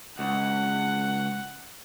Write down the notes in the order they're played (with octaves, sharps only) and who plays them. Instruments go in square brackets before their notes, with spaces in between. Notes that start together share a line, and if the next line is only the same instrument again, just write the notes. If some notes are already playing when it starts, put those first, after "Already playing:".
[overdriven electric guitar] C#2 [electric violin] F#5